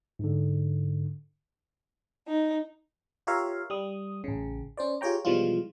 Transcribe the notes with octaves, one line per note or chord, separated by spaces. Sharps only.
G#2 D3
D#4
F4 G4 A#4 C#5 E5 F5
G3 D#6
A1 C#3
C#4 C5 D5
F4 G4 G#4 C#5 G5 A#5
B2 E3 F3 G3 G#3 F4